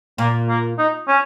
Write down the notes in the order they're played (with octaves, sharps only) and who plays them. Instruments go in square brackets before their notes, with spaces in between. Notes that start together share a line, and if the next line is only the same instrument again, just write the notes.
[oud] A#2 [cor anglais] A#3
[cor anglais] A#3
D#4
C#4